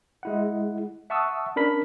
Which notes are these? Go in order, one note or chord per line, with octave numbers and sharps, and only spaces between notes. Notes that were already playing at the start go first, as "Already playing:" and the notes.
G#3 E4 F#5
E5 F#5 A5 C#6 D#6 E6
C#4 D4 A#4 B5 B6